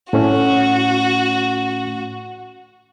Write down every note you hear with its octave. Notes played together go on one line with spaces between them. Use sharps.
A2 A3 C#4 F#4